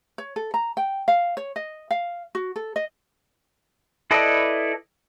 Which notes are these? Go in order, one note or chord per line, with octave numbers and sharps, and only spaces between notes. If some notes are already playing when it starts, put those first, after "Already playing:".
C#5
A4
A#5
G5
F5
C#5
D#5
F5
F#4
A4
D#5
E4 A4 B4 D5 D#5